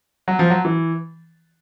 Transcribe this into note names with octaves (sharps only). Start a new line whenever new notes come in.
F#3
F3
F#3
E3